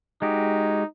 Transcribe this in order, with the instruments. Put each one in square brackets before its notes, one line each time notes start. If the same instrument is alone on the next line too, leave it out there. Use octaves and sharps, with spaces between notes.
[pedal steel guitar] G#3 F#4 G4 [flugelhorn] D#4